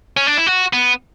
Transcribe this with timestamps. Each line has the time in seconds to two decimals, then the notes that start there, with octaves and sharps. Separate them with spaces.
0.17 C#4
0.27 D4
0.37 E4
0.47 F#4
0.73 B3